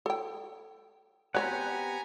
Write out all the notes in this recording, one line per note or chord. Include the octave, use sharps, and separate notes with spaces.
A4 G5
B3 C4 G4 C#5 D5 F#5 G#5 A#5